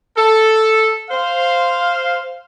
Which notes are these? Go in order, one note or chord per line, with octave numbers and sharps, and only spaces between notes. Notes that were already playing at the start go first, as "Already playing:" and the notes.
A4
C5 F5